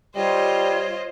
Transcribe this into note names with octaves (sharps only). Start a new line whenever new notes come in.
G3 F4 C5 C#5 D#5